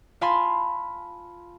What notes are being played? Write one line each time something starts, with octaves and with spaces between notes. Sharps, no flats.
F4 F5 G#5 A5 B5 C6